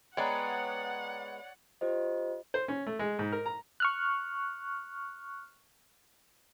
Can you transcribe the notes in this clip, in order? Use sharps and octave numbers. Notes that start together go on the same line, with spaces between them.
G#3 B3 C#5 D5 F#5 G5 A#5
F4 G4 C5 D#5
C5
C#4
A3
G#3
G#2
A#4
A#5
C#6 F6 F#6